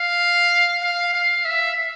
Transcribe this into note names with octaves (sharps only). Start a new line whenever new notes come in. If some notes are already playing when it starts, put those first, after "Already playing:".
Already playing: F5
F5
F5
E5